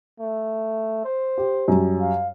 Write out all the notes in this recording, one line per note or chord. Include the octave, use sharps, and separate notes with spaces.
A3
C5
G4
F#2 G3
F5